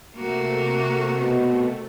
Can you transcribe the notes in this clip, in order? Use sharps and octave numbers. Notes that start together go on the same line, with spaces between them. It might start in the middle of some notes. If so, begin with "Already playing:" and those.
C3 A3 A#3 F#4
B2